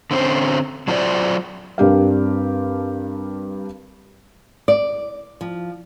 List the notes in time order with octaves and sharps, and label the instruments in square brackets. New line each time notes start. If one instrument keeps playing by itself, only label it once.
[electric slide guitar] D3 C4 C#4 C5
F#3 D4 F4 F#4 C5 D5
[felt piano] G2 C4 D4 G4 A#4 F5
[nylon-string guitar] D5
F3